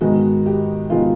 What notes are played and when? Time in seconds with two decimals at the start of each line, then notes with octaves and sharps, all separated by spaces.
0.01 G#2 D#3 G#3 B3 F#4
0.46 G4
0.90 D#3 G#3 B3 F4